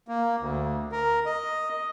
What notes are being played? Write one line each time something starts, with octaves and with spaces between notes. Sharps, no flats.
A#3
D2
A#4
D#5